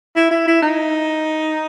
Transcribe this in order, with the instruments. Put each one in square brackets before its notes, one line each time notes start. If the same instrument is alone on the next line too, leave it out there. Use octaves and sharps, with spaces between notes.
[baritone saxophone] E4
E4
E4
D#4